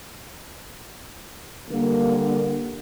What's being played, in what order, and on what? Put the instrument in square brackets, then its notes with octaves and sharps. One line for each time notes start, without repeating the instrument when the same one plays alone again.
[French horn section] D3 G3 A#3